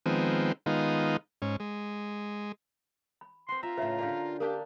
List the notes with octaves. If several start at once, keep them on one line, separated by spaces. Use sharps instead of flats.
D#3 F3 G#3 B3 C4
D#3 G#3 B3 D#4 F4
G#2 C#4
G#3
B5
C4 F#4 C6
F4 E5 A#5
A2 C#3 B4 C#5 E5
D3 G4 A#4 D5 F5
A#3 D4 G4 A#4 F5 G5